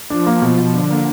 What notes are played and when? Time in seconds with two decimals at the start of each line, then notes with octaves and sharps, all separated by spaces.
0.10 F3 D4
0.26 A#3
0.42 B2 F3
0.58 B2
0.74 D3 D4
0.90 A#3